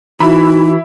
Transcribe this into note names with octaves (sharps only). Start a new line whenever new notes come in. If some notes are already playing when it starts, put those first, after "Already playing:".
E3 D#4 E4 F#4 B5